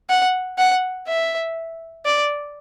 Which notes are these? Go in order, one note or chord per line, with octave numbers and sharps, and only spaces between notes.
F#5
F#5
E5
D5